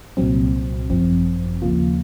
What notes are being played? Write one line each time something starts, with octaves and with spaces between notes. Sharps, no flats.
C2 A#2 F#3 C4
G#1 F#2 F3 C4
D#2 C#3 F3 A#3 F4